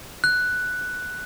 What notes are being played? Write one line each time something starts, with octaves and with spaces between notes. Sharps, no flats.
F#6